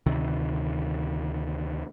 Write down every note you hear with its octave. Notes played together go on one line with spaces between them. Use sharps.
D2 C3 D#3